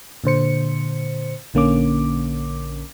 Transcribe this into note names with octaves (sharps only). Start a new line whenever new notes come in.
A#2 D3 C5 C#7
A#1 D3 A#3 C#4 D6